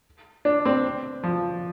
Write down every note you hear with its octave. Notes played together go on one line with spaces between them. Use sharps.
D4
C4
F3